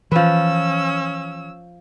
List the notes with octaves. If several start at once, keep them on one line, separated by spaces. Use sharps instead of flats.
E3 F3 C#4 B4 E6